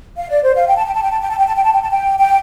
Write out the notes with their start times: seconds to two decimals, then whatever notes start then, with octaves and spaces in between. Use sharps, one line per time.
0.17 F5
0.30 D5
0.42 C5
0.55 F5
0.67 G5
0.77 A5
0.85 G5
0.94 A5
1.02 G5
1.11 A5
1.21 G5
1.30 A5
1.38 G5
1.47 A5
1.55 G5
1.64 A5
1.72 G5
1.82 A5
1.90 G5
2.19 G5